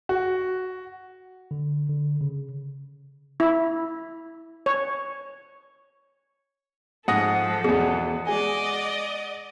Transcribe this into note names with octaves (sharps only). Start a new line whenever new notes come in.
F#4
D3
D3
C#3
E4
C#5
G#2 F3 A4 F#5 D#6 A#6
E2 B2 G#4
G#3 D5 D#5 G#5